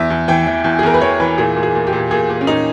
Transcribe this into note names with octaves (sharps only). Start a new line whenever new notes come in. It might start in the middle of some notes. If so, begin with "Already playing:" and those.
Already playing: E2 E5
E2
E3 G5
E3
E2
G#4
E2 A#4
B4
E2 C#5
E3 B4
A#2 G#4
A#2
G#4
A#2
G4
A#2
A#2 G#4
A#2
C#4
A#2 D#4